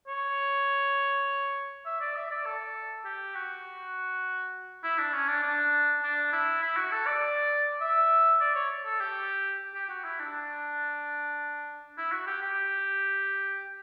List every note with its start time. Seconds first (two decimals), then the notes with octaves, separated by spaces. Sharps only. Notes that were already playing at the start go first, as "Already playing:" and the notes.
0.08 C#5
1.86 E5
2.01 D5
2.16 E5
2.31 D5
2.46 A4
3.05 G4
3.35 F#4
4.84 E4
4.98 D4
5.13 C#4
5.29 D4
5.43 D4
6.03 D4
6.33 E4
6.62 E4
6.77 F#4
6.92 A4
7.07 D5
7.81 E5
8.41 D5
8.55 C#5
8.85 A4
9.00 G4
9.75 G4
9.89 F#4
10.04 E4
10.19 D4
11.97 E4
12.12 F#4
12.27 G4
12.42 G4